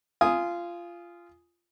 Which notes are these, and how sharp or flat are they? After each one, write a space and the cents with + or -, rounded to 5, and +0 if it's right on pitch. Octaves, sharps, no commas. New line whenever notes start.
F4 -15 G#5 +0 D#6 +0